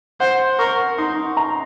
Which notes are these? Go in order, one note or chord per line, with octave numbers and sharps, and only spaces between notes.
C5 F#5
A#4 C#6
D#4 C6
A#5